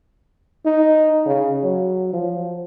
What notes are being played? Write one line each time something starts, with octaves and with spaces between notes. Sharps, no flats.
D#4
C#3
F#3
F3